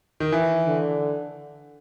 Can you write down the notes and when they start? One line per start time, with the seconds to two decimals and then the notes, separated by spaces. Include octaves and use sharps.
0.20 D#3
0.32 D#3 E3
0.67 D3